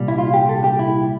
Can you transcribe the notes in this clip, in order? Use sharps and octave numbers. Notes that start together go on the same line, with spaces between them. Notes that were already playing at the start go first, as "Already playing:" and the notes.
Already playing: C2 A#2 G3
E4
F4
G4
A4
G4
E4